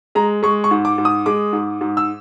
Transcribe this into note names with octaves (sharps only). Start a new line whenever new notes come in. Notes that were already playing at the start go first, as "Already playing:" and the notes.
G#3 A#5
G#3 C#6
C#6
G#2
D6
G#2
D#6
G#3 D6
G#2
G#2
E6